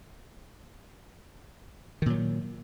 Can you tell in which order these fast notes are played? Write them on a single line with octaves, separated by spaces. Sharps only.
D#3 A#2 F#3